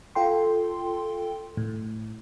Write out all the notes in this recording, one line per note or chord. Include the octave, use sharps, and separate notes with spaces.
F4 A4 G5 C6
A2